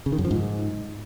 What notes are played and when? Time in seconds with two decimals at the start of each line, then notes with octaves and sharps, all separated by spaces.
0.06 C#3
0.12 D#3
0.18 F#2
0.25 F3
0.31 G#2